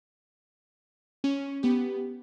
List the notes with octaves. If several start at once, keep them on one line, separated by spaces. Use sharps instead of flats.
C#4
B3 G4